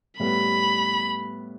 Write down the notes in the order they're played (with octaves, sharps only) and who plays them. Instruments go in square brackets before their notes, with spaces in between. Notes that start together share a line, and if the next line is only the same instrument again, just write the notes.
[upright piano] A2 G3 B3 [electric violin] B5